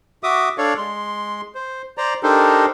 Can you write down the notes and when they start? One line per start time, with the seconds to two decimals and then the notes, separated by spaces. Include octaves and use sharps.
0.23 F#4 E5 D6 D#6
0.58 D4 A4 C#5 D5 F5 C#6
0.77 G#3 C6
1.55 C5
1.98 C5 D5 A#5
2.23 D4 D#4 G4 A4 A#4 C5